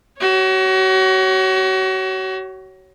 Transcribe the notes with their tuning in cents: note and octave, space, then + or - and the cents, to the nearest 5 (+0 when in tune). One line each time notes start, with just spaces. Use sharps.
F#4 +35 C#5 +0